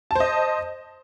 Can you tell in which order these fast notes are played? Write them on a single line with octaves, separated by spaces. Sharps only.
A5 C5 D#5